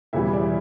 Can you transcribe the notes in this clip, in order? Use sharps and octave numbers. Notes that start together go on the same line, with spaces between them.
E1 E2 C#3 E3 G3 E4 E5
D5